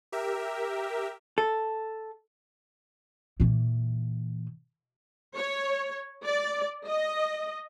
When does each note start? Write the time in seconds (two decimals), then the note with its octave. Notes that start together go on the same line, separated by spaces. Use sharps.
0.12 G4 A#4 E5
1.38 A4
3.40 A#2 E3
5.36 C#5
6.24 D5
6.87 D#5